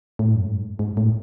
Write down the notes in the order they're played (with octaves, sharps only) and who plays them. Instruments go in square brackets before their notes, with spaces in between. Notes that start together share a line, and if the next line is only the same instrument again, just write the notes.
[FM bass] A2
F#2
G#2
G#2
A2